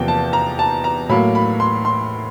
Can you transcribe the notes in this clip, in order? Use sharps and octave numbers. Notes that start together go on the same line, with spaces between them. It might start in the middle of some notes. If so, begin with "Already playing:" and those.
Already playing: E2 C3 F3 A#3 G5
A5
A#5
A5
A#5
A2 F#3 A#3 B5
B5
C6
C6